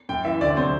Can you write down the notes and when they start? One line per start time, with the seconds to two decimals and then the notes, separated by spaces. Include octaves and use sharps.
0.09 F#2 G5
0.25 E3 E5
0.41 D2 D5
0.57 C3 F#3 C5